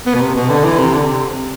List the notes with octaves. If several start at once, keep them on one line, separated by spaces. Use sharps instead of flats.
B3
B2
C3
B2
D3
E3
C3
D3
C3